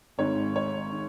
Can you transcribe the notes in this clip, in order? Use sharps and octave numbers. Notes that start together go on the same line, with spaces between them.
G#1 G#2 D#3 C#5
C#5
D#3